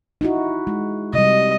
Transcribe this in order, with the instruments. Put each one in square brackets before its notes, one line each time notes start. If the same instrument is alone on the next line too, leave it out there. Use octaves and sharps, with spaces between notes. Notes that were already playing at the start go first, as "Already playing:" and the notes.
[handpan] D#4 E4 F#4
G#3
[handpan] C3 G3 [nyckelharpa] D#5